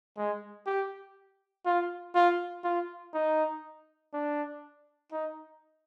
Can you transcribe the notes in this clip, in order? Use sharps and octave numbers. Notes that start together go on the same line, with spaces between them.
G#3
G4
F4
F4
F4
D#4
D4
D#4